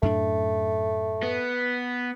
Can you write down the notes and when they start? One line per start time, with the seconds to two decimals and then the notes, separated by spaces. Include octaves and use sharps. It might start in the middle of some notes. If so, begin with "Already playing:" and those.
0.02 F#2 A2 A3 D4
1.23 B3